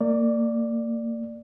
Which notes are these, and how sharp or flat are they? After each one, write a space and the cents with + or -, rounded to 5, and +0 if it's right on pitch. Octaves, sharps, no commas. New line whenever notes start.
A#3 -30 D5 +10